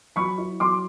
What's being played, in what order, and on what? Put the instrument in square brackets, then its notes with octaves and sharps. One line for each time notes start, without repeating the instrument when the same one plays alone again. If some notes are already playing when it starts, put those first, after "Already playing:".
[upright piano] F#3 B5 C#6
E4
F#3 C6 D6